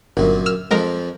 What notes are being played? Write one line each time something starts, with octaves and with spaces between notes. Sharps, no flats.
G1 F#2 A#2
E6 F6
F2 F3 G#3 A#4